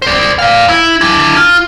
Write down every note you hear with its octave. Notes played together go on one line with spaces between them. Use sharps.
C5 D5
D5 F5
E4
D4 E4
F4